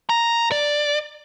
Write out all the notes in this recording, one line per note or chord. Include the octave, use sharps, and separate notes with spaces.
A#5
D5